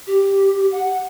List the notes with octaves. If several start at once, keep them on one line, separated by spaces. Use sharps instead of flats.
G4
F#5